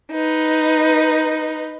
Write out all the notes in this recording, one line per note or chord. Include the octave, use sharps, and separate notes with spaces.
D#4 B4